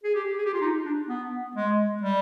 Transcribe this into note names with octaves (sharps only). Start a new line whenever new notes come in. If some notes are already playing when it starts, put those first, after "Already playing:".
G#4
G4
G#4
G4
F4
D#4
D4
B3
G#3
G3